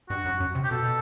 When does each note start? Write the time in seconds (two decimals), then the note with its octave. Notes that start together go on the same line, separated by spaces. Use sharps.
0.09 G2 F#4
0.25 F#2
0.40 F#2
0.55 C3
0.64 G4
0.71 B2 A4